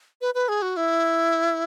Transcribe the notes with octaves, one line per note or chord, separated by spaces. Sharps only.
B4
B4
G#4
F#4
E4